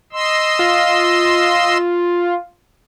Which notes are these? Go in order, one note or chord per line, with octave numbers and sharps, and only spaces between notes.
D#5 C6 E6
F4